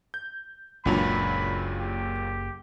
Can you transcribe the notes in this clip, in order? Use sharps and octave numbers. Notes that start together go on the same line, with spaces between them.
G6
F#1 C#2 A#2 F#3 D4 B5 F7
G4